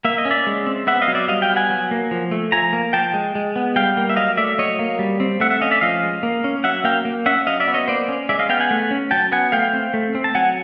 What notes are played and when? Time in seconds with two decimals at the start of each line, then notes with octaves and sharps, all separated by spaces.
0.05 A#3 E5
0.18 D#5
0.25 C#4
0.31 D5 E5
0.47 G#3
0.66 C4
0.87 B3 E5 F#5
1.02 D#5 F5
1.08 F#3
1.15 D5 E5
1.28 G3 D#5 F5
1.42 F5 G5
1.50 B3
1.56 F#5 G#5
1.70 F#3
1.91 A#3
2.11 F3
2.31 A3
2.52 F3 G#5 A#5
2.73 A#3
2.93 F3 G5 A5
3.14 G#3
3.35 G#3
3.56 B3
3.76 G3 F5 G5
3.97 A#3
4.09 E5
4.16 F#3 D#5 F5
4.37 A3 D5 E5
4.58 F#3 C#5 D#5
4.79 A#3
4.99 G3
5.20 C4
5.40 A3 E5 F#5
5.50 E5 F#5
5.61 C#4 D#5 F5
5.71 D5 E5
5.81 F3 D#5 F5
6.03 G#3
6.23 A#3
6.44 C#4
6.64 F#3 E5 F#5
6.84 A#3 F5 G5
7.05 A#3
7.26 C#4 E5 F#5
7.47 F#3 D#5 F5
7.60 D5 E5
7.68 B3
7.74 C#5 D#5
7.88 A#3 C5 D5
8.08 C#4
8.29 G#3 D5 E5
8.39 D#5 F5
8.49 B3 F5 G5
8.60 F#5 G#5
8.71 A3
8.91 C#4
9.11 F#3 G5 A5
9.32 B3 F#5 G#5
9.52 A3 F5 G5
9.73 C4
9.94 A3
10.15 C4
10.24 A5
10.35 F#3 F#5 G#5